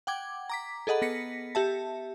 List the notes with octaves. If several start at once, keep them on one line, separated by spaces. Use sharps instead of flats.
F#5 G5 D6 G#6
A#5 D6 B6
G#4 A4 D#5 F#5 B5
B3 A#6 B6 C#7
G4 E5 A5